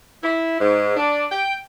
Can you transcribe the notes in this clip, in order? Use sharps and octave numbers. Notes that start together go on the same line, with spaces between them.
E4
G#2
D4
G5